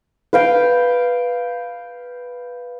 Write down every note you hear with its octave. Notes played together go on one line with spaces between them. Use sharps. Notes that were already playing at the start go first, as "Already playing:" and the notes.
B4 F5 G5